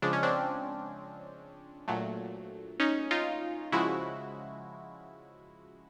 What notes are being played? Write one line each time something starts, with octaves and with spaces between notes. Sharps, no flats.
C#3 F3 G#3 D4
C#4
C4 D4
A#2 F#3 A3
C#4 D#4
D#4 F4
C#3 F3 G#3 E4 F#4